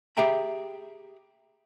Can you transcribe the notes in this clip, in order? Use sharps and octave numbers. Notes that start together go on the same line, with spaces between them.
G4 G#4 E5 G5 A#5 B5